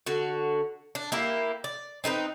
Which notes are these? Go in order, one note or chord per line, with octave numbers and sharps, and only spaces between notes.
D3 F#4
D4
A#3 E4 G4
D5
C4 D#4 A#4 B4